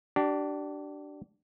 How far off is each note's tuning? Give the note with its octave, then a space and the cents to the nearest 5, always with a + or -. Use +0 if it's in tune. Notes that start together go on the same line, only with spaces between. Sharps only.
D4 +0 G4 -35